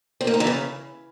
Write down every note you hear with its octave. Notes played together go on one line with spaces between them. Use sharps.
C4
A#3
D#4
E3
C#3